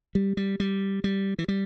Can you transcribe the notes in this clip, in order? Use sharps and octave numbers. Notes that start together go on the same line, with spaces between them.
G3
G3
G3
G3
E3
G3